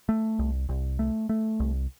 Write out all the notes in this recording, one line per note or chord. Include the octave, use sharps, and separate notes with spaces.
A3
C2
C2
A3
A3
C2